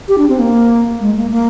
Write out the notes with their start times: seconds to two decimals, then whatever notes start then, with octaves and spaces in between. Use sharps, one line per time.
0.08 G4
0.18 D4
0.29 C4
0.39 A#3
1.00 G#3
1.16 A#3
1.31 A#3